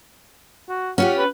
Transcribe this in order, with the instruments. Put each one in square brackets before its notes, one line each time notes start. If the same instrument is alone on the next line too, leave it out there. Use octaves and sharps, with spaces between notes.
[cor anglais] F#4
[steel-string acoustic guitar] C#4 F4 G4 [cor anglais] F#5
[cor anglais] B4